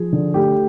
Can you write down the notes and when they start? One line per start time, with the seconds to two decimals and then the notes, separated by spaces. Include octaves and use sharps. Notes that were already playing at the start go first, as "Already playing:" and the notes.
Already playing: F3 G#4
0.13 D3
0.34 A3 G4